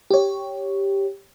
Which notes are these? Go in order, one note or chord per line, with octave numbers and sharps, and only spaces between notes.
G4 C#5